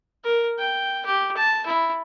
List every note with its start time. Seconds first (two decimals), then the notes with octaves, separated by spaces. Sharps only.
0.24 A#4
0.59 G5
1.06 G4
1.37 A5
1.66 E4